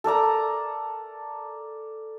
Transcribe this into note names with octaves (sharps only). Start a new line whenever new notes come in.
A4 A#4 D5 A#5